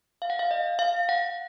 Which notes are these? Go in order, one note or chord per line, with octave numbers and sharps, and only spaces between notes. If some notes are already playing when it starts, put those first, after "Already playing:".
F5
F#5
F5
D#5
F5
F#5